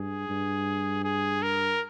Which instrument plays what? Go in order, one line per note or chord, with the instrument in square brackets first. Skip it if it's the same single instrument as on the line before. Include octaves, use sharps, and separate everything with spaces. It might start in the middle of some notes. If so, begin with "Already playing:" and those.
Already playing: [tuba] G2 [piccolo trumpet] G#4
[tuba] G2
[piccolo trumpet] G#4
A#4